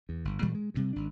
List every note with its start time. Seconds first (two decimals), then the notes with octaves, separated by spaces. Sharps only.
0.09 E2
0.25 G1
0.42 A#2 E3 G3 G#3
0.55 G#3
0.74 D2 C3 G3
0.93 G#1 D4